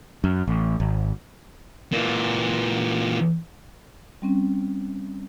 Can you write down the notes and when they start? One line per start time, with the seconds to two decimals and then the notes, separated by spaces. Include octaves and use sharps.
0.24 F#2
0.48 A1
0.80 G#1
1.92 A#2 E3
4.22 G3 C4 C#4